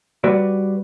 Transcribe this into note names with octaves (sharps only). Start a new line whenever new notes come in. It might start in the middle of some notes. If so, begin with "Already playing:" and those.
G3 F#4 B4 D5